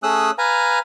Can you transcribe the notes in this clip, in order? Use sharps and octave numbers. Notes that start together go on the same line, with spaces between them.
A3 C#4 G#4 D#6 E6 F#6
B4 F5 G#5 A#5